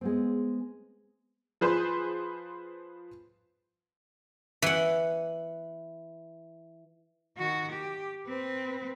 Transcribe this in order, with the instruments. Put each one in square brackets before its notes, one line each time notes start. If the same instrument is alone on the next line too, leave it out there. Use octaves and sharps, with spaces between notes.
[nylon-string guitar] G#3 B3 C4
[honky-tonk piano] F3 G#4 B4 C5 C6
[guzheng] E3 F#5
[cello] D#3 F#4
G4
C4 B4